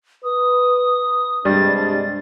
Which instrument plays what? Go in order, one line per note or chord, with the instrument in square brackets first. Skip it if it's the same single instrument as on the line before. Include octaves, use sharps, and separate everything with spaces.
[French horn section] B4 [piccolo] D#6
[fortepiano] G2 G3 [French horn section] C3 G#3 D4 [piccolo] A6